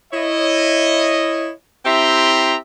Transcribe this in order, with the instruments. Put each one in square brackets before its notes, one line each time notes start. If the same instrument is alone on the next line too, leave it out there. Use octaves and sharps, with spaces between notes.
[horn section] E4 C#5 D#5
C4 E4 G4 E5 A#5 C6